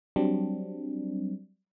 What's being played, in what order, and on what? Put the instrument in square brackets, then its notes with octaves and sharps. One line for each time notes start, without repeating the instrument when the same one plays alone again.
[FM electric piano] F#3 G3 C4 D4